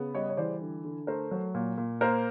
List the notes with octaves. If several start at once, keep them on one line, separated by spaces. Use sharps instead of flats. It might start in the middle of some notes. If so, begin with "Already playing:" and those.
Already playing: C#3 B3
G3 C#5 D#5
C#5
E3 C5 D5
D3
D3
A3 A#4 C5
F#3
A#2
A#2
A#3 A#4 C5